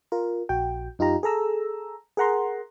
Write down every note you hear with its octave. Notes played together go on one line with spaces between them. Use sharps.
F4 A#4
A#1 F#4 G5
F#2 D#4 F4 G4 A#5
G#4 A4 A#5 E6
G#4 A#4 F#5 A#5 C6